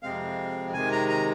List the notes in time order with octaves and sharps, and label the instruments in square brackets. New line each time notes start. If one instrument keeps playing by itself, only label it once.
[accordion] F2 C3 G#3 C4 F5
C3 D#3 G#3 G#5
A#5
A#5